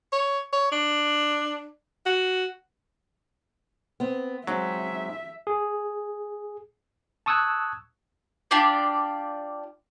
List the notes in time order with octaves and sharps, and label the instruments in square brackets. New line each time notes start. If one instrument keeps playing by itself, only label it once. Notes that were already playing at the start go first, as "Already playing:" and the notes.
[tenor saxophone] C#5
C#5
D4
F#4
[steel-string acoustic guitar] B3 C4
[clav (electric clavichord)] F#3 [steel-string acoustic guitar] G#3 C4 D#4 [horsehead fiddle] E5
[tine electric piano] G#4
A5 C#6 D#6 E6 F#6 G#6
[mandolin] D4 F4 G4 D5